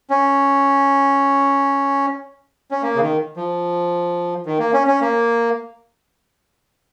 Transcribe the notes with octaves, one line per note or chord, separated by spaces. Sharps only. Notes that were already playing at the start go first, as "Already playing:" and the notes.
C#4
C#4
A#3
C#3
D#3
F3
D#3
A#3
C#4
C#4
A#3